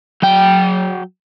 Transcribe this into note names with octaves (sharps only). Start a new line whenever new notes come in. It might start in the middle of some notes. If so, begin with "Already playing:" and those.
F#3 G5